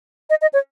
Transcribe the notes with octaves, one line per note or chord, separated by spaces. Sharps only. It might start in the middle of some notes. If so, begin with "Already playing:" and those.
D#5
D#5
C#5